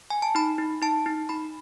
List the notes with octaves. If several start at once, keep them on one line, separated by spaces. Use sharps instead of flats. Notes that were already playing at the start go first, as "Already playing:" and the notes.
G#5
A5
D#4 B5
D#4
D#4 A5
D#4
D#4 B5